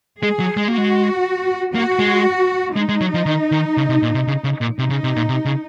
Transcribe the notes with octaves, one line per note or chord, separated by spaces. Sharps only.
G#3 G#4
F#3
G#3
A#3
G#3 F#4
A#3 F#4
G#3
G#3 D#4
G#3
F#3
F3
D#3
D#3
C#3
C3
A#2
C3
C#3
C#3
A#2
C3 D#4
C#3
C3
A#2
C3
C#3